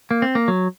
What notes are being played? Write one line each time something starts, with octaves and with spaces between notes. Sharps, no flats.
A#3
C4
A#3
F#3